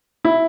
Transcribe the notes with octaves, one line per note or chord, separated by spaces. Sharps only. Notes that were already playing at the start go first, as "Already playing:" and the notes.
E4